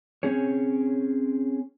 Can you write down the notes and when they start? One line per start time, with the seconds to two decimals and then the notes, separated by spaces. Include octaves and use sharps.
0.23 C4 C#4 G#4 C#5